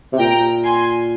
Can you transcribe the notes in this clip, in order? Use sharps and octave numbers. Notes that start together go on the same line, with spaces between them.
C3
A#2 G5 A#5
G#5 C6